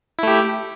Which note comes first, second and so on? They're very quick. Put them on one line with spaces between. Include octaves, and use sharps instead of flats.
E4 A3 G4